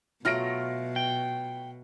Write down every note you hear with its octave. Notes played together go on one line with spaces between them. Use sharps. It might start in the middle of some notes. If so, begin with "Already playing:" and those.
B2 F#3 A3 F4 F6 A#6 D7
G5